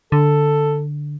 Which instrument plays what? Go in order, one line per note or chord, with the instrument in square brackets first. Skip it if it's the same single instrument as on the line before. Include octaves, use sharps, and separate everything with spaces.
[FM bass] D3 [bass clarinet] A4